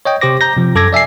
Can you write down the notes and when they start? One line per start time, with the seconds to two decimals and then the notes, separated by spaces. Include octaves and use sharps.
0.05 C#5 D#5 G5
0.21 C3 G4 C5 D6 A#6
0.41 A#5 G6 A#6
0.56 C3 F3
0.75 F#2 A4 D6 G#6 A#6
0.93 D5 E5 G#5 C7